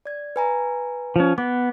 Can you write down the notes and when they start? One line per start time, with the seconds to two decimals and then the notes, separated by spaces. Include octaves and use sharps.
0.05 D5 G#6
0.36 B4 G#5 A#5
1.16 F3 C#4
1.38 B3 D6